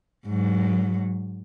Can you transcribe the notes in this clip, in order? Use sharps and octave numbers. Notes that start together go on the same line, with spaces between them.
G#2 F#3